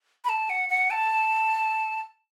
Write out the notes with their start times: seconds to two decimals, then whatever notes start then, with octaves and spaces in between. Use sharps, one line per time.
0.24 B5
0.29 A5
0.50 F#5
0.69 F#5
0.90 A5